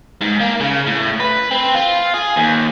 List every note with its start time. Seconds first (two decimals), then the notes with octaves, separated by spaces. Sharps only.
0.21 G#2
0.40 A#3
0.60 C#3
0.87 A2
1.20 B4
1.51 C4
1.75 F4
2.14 G#4
2.36 D#2